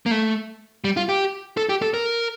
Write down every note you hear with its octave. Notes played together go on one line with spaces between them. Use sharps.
A#3
A3
G3
F4
G4
A4
G4
A4
A#4